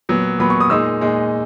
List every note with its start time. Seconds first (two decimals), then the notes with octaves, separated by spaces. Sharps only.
0.09 A#2 F#3 B3
0.39 A#2 F#3 B3 B5
0.50 C#6
0.60 D#6
0.70 A#2 G#3 D#4 E6
1.01 A#2 G#3 D#4